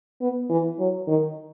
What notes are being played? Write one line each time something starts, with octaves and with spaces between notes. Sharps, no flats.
B3
E3
F#3
D#3